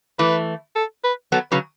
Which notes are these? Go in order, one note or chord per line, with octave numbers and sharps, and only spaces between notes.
E3 A3 B4
A4
B4
F#3 B3 A4
C#3 F#3 B4